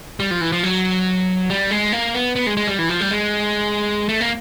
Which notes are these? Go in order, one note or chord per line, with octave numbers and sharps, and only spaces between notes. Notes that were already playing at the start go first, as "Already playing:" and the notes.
G3
F3
E3
F3
F#3
G3
G#3
A#3
B3
B3
G#3
G#3
G3
E3
F3
G3
G#3
A3
A#3